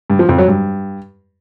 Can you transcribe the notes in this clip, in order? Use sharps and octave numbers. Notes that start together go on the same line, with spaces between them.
G2
F3
F2
F#3
G2